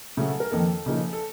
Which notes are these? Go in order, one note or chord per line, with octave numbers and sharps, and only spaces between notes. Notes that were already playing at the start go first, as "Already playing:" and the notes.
C#3 F#3 A3 F#4
A4
A#4
F2 D#3 A#3 D#4 A4
C#3 F3 A#3 D#4
A4